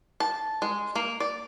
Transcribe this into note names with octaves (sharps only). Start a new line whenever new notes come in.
A5
G#3
A#3
D5